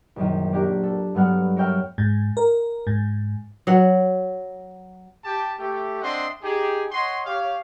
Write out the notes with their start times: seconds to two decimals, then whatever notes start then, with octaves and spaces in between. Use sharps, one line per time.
0.16 A#1 F#2 D#3
0.52 A#3 D4 G4 A#4
0.83 A4
1.15 G2 F#3 B3 F#5 F6
1.56 A#4 C#5 E5 G5 C#6 F6
1.98 G#2
2.37 A#4
2.87 G#2
3.67 F#3 F#5
5.24 G4 G5 A5
5.59 A3 G4
6.02 C4 D4 D#5 E5 F#5 C6
6.43 D#4 G4 G#4
6.92 C#5 D#5 F#5 C6
7.26 G4 C#5 F5